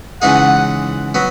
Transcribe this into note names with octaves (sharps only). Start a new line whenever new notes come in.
C#3 E3 G#3 D#4 G#4 F#5
F#3 B3